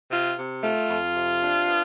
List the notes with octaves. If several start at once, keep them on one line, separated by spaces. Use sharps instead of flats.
C3 F4
C3
A3 F4
F2
C3
D4
B3